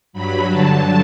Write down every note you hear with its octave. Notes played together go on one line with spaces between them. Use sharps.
G2 F#3 B5
G2 D3 F#3 A5